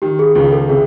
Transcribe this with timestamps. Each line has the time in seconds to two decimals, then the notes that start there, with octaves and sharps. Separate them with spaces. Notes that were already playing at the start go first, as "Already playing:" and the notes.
0.02 D#3 G4
0.19 G#4
0.35 C#2 G#4
0.52 A4
0.69 C3 G#4